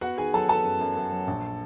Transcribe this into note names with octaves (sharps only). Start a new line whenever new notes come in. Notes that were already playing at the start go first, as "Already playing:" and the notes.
B3 F#4 F#5
D#3 G#4 G#5
F#3 A4 A5
B3 A4 A5
F#2
F#2
F#2
F#3
A#1